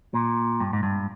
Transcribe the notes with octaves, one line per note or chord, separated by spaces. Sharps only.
A#2
G2
G#2
G2